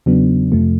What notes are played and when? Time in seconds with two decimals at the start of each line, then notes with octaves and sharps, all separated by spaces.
0.06 E2 C#3 F#3 B3 D4
0.52 F2 C3 F3 A3